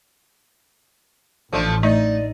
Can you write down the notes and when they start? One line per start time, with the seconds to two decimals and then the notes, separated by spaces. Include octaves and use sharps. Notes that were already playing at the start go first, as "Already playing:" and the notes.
1.53 A1 F3 A3 D4
1.83 A3 D#4 D5